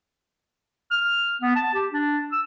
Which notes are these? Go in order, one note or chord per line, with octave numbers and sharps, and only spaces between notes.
F6
B3
A5
G4
D4
E6